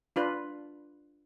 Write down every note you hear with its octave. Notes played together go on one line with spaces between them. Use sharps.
D4 F4 B4